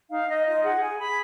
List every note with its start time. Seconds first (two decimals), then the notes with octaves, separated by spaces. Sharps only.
0.10 D#4 F5
0.28 D#4 D#5
0.46 F4 D#5
0.63 G#4 F#5
0.81 G#4 G#5
0.99 G#4 B5